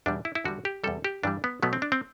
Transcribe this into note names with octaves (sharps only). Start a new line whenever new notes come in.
E2 B2 G3 D4
E4
E4
E2 D3 G3 F#4
G4
E2 C3 G3 A4
G4
G2 E3 G3 D4
B3
B2 F#3 A3 B3
C4
D4
C4